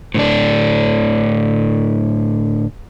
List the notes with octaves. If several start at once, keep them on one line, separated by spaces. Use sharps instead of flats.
A2 D3 D4